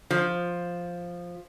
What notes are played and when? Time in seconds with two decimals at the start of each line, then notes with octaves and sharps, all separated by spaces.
0.11 F3